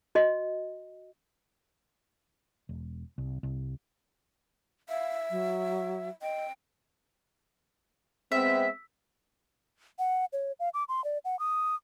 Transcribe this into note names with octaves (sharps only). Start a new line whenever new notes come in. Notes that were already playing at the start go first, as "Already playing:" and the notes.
F#4 D#5
E1
C2
C2
E5 F5
F#3
D#5 G5
G#3 B3 C4 E5
F#5
C#5
F5
D6
C6
D5
F#5
D#6